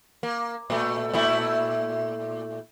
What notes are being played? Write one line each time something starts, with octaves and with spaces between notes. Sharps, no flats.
A#3
A#2 A3
A#2 A3 E4